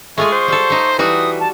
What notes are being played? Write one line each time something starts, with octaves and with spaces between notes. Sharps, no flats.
G#3 A3 F4 G#4 C#6
C5
G3 A4
A3 D#4
E3 G3 F#4 D#6
A5